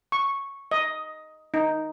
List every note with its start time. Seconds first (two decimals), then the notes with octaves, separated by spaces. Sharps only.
0.12 C#6
0.71 D#5
1.54 D#4